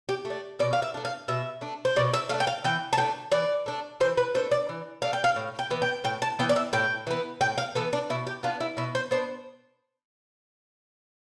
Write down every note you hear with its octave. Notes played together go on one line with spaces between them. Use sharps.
G4
A3
D4
B2 D5
F5
E5
A3 D4
F5
B2 E5
A3 D4
C5
B2 D5
E5
A3 D4 F5
G5
F5
E3 G5
A5
A3 D4 G5
E3 D5
A3 D4
E3 C5
B4
A3 D4 C5
D5
E3
A3 D4 F5
G5
F5
A2
G5
E3 B3
G5
A2 G5
A5
E3 B3 G5
D5
E5
A2 G5
E3 B3
A2 G5
F5
E3 B3 A4
D4
B2 E4
G4
B3 D4 F4
E4
B2 E4
C5
B3 D4 C5